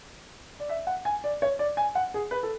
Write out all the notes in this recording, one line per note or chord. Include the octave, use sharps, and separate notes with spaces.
D5
E5
F#5
G#5
D5
C#5
D5
G#5
F#5
G#4
B4
A4